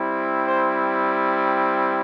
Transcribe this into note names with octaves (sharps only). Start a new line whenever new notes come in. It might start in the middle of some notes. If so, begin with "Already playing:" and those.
Already playing: G3 C4 E4
C5